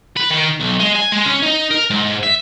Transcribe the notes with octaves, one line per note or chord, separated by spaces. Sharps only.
B4
D#3
B1
G#3
G#5
G#3
C#4
D#4
A#4
G#2
E5